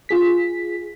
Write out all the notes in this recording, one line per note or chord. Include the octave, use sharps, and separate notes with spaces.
F4 G#4 B6